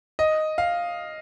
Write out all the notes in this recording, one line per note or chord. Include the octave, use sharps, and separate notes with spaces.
D#5
F5